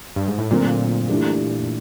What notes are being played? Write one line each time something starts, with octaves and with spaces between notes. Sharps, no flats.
G2
G#2
A2
A#2 D3 F#3 A3 C4 F4
E3 A3 D4 G4